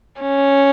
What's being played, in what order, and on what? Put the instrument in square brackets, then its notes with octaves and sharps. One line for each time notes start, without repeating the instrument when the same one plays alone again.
[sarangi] C#4